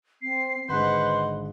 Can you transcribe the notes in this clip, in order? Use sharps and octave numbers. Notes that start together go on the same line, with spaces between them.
C4 C7
G#1 D3 G#3 B4 C5 D#5 F#5 C6